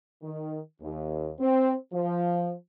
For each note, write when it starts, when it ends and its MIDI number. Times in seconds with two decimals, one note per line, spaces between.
0.22 0.58 51
0.82 1.31 39
1.40 1.73 60
1.93 2.53 53